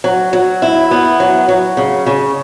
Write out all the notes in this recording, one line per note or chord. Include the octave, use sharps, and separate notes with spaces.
F#3
F#3
E4
B3
F#3
F#3
C#3
C#3